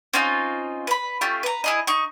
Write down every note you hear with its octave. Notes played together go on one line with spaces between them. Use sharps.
C4 C#4 D#4 F4
B4 B5
A3 C#4 F4 G4
B4 A#5
E4 G#4 D#5
D#4 C#6